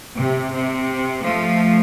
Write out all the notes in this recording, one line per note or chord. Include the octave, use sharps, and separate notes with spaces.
C3
C3
F3 A3